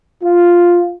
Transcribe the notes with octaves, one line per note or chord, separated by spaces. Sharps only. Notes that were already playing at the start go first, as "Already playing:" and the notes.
F4